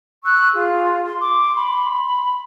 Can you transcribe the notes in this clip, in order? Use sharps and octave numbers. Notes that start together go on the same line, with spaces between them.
C#6 E6 F#6
F4 G#4
C6
D6
B5